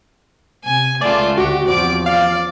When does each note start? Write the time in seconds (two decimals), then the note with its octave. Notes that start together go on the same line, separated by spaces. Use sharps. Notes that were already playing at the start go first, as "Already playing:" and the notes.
0.64 C3 G#5
1.01 C#2 C#3 A3 F4 D5
1.38 D2 F#4 G4
1.67 E2 F3 C4 D5 D6
2.06 D5 F5